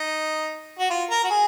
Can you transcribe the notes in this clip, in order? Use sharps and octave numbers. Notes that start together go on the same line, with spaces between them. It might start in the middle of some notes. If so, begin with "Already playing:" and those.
Already playing: D#4
F#4
F4
A#4
F#4
G#4